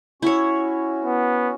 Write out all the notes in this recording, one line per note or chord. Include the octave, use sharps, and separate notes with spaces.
C#4 E4 F#4 C#5
B3